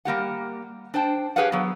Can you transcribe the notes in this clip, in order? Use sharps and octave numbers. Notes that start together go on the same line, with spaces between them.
G3 A#3 G4 F#5
D4 C5 G5 A5
G4 G#4 B4 C#5 F5 F#5
F#3 B3